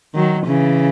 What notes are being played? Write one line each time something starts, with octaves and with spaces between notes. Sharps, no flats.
D#3 F#3
C#3 E3